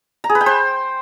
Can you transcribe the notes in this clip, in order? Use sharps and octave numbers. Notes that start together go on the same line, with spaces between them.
A#5
G#4
B4
G5
C5